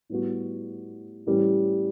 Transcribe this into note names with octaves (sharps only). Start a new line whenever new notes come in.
A2 G3 B3 F#4
A2 E3 G3 C#4 G4